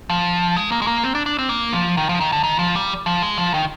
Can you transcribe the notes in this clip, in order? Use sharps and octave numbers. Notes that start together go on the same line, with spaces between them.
F3
G#3
A#3
G#3
A#3
C4
D4
D4
C4
A#3
F3
D#3
F3
D#3
D3
D#3
F3
G3
F3
G#3
F3
D#3